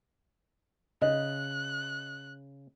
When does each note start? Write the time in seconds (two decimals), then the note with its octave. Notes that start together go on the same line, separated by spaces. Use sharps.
1.02 C#3 D#5 F#6